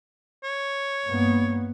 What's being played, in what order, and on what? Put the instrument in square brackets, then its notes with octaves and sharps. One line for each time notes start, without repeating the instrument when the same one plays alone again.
[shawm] C#5
[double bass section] G2 A#3 B3